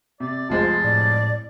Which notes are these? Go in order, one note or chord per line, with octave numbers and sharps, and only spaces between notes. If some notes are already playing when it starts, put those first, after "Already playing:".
C3 D5
F1 G#3 F4 C5 A5
A2 D5